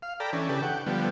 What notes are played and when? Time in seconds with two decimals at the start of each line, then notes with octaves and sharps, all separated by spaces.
0.02 F5
0.20 A4 D5 G5 A#5 B5
0.33 E3 C#4 D4
0.49 C#3 D4 G4 A4 B4
0.63 F#5 G5
0.86 D3 F3 G3 B3